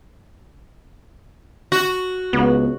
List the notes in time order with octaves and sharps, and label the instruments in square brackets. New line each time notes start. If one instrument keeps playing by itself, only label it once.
[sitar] F#4
[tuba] C#2 [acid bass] B3